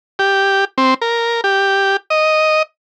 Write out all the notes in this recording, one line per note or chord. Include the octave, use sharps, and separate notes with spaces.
G4
C4
A#4
G4
D#5